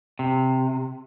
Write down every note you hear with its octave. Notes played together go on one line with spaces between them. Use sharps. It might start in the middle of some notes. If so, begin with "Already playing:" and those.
C3